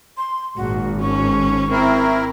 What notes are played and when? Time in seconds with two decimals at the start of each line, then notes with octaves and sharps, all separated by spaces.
0.17 C6
0.57 G#1 A#2 F#4
1.01 C#4 C#6
1.71 C4 E4 A#4